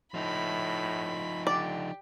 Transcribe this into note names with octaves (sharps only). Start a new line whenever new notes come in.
A2 F3 D#4 B5
D3 G4 D5